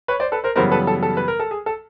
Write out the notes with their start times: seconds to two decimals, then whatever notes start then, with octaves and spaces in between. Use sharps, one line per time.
0.08 B4 C#5
0.20 C5 D5
0.32 A4 B4
0.44 A#4 C5
0.56 F#2 C#3 E3 G3 B3 A#4 C5
0.71 A4 B4
0.87 A4
1.03 A4
1.17 B4
1.28 A#4
1.40 A4
1.51 G#4
1.66 A4